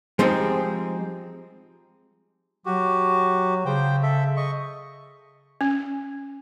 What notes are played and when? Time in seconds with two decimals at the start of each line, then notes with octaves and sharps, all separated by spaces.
0.19 F3 G3 G#3 C4 D#4
2.66 F#3 F#4 G4
3.66 C#3 C5 G5
4.03 A4 E5
4.37 D#5 C#6
5.61 C#4